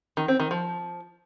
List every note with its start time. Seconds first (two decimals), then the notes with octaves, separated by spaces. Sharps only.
0.17 D#3
0.28 C4
0.40 D#3
0.51 F3